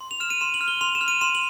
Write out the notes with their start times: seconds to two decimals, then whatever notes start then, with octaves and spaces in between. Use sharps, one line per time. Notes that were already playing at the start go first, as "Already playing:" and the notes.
0.01 C6
0.11 F7
0.20 F6 E7
0.30 D#7
0.41 C6 E7
0.54 F#7
0.61 F6
0.68 G7
0.81 C6 F7
0.95 E7
1.01 F6
1.08 D#7
1.21 C6 E7
1.35 F#7